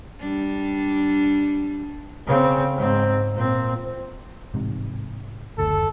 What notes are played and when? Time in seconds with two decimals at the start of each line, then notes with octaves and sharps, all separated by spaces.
0.20 G3 D4
2.27 C#3 C4
2.75 G#2 C4
3.34 A#2 C4
4.54 A1 G#2 C3
5.58 F#1 D2 A4